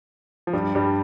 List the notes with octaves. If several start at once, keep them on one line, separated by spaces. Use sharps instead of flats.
F3
G2 G3
G2 G3